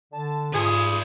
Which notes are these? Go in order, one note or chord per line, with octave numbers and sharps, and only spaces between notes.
D3 A5
G#2 F4 G#4 B4 D5 G#5